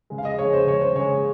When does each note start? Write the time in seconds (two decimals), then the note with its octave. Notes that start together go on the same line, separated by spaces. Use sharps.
0.10 C#3 G#3
0.18 F5
0.25 D#5
0.39 C#3 G#3 C#5
0.53 C5
0.67 C#3 G#3 C#5
0.81 C5
0.96 C#3 G#3 C#5